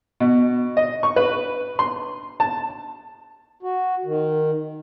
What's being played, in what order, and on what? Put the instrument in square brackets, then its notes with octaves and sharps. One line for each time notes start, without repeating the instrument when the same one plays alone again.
[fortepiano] B2
D#5
C#6
B4
C6
A5
[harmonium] F#4
D#3